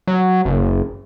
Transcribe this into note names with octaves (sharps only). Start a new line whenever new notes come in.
F#3
F#1